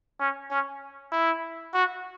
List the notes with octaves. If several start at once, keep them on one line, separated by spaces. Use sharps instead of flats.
C#4
C#4
E4
F#4